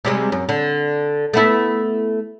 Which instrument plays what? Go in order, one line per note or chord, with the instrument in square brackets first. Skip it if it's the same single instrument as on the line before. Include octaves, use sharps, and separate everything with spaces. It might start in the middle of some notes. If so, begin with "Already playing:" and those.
[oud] C3 G3 G#3
F#2
D3
A3 B3 E4